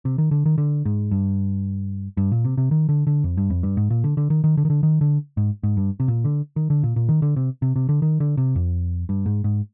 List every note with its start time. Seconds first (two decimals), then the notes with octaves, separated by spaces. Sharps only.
0.05 C3
0.18 D#3
0.31 D3
0.46 D#3
0.58 D3
0.85 G#2
1.11 G2
2.17 G2
2.32 A#2
2.45 C3
2.57 C3
2.71 D#3
2.89 D3
3.07 D3
3.24 F2
3.37 G2
3.50 F2
3.63 G2
3.77 G#2
3.90 A#2
4.04 D3
4.17 D3
4.30 D#3
4.44 D#3
4.57 D3
4.65 D#3
4.70 D3
4.83 D#3
5.01 D3
5.37 G#2
5.63 G#2
5.77 G2
6.00 C3
6.08 A#2
6.25 D3
6.56 D#3
6.70 D3
6.83 A#2
6.96 A#2
7.09 D#3
7.22 D3
7.36 C3
7.62 C3
7.76 C3
7.89 D3
8.02 D#3
8.20 D3
8.37 C3
8.56 F2
9.09 G2
9.26 G#2
9.44 G#2